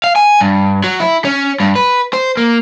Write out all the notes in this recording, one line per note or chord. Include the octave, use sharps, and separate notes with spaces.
F5
G#5
G2
F#3
E4
C#4
G2
B4
C5
A#3